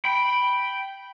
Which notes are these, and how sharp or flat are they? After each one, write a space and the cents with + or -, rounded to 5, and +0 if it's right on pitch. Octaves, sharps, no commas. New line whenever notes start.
G5 +0 B5 +0